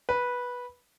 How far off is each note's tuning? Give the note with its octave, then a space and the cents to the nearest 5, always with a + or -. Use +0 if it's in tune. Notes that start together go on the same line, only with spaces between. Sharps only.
B4 -10